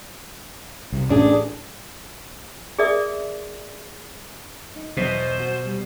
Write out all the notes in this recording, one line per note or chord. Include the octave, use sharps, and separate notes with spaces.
C2
A1 A2 C#4 D4 G#4
G#4 A#4 D5 E5 D#6
D#4
E2 B2 F#3 C5 D#5
F#4
G3